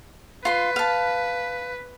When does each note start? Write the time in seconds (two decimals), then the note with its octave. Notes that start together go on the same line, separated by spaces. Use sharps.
0.45 F4 B4 C6
0.76 F5 A5